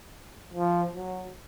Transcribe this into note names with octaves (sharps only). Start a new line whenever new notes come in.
F3
F#3